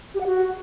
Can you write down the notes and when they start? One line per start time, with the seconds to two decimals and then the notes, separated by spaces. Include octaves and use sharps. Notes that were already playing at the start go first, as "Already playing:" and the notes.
0.15 G4
0.21 F#5
0.27 F#4